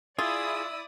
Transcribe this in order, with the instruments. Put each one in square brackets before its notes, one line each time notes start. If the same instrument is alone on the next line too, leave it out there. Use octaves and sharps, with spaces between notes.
[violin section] E4 D5 D#6 [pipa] F4 [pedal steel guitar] G#4 [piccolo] E6